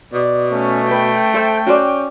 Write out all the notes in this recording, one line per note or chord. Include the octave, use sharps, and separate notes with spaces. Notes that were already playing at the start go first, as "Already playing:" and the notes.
B2 D5
A3 C#4
B4 G5
A4 C5 E5
C#4 F#4 C5 D5